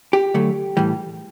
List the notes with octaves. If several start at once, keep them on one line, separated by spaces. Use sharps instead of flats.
G4
D3 F#3 A3
A2 E3 G3